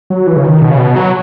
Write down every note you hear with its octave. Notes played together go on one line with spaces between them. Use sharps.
F#3
E3
C#3
D#3
B2
C#3
B2
F#3